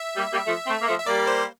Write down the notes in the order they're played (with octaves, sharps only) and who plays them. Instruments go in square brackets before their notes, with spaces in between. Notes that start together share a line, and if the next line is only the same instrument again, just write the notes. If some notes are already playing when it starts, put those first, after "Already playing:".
Already playing: [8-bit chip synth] E5
[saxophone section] G3 A#3
G3 A#3
F3 A3
A3 C4
A#3
F3 A3
[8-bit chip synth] E5
[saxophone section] G3 A#3 [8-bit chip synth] D5
[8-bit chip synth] C5